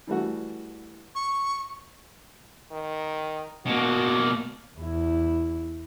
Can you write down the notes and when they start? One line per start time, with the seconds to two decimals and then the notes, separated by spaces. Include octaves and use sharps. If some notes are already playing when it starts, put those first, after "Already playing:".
0.07 E3 G3 A3 F#4
1.15 C#6
2.72 D#3
3.66 B2 A#3 F#4
4.79 E2 E4